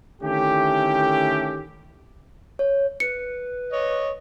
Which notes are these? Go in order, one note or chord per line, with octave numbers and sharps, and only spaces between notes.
D3 D#3 A3 C#4 E4 G4
C#5
B4 C#7
C#5 D#5